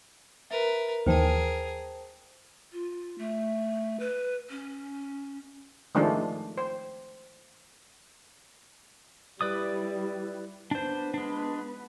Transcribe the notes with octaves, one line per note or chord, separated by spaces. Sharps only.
A#4 B4 E5
D#2 E3 G#4 A#4 C5 G5 A5 D#7
F4
A3
B4
C#4
D#3 F3 G#3 A3 D4
C5
G3 E4 B4 D5 D#6
B3 D4 B4 C5
G#3 D4